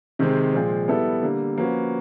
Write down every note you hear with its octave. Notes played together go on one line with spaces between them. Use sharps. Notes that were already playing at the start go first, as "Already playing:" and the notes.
C3 D#3 G#3 C4
A#2 F3 G#3 C4
G3 B3 E4 A4
D3 G3 A#3
F3 A#3 C#4 F#4 B4